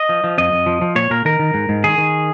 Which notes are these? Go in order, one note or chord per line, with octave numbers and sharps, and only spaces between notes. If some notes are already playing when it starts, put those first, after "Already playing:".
Already playing: D#5
F3
F3
F2 D#5
F2
F3
F3
A#2 C#5
A#2 A#4
D#3 A#4
D#3
G#2
G#2
D#3 G#4
D#3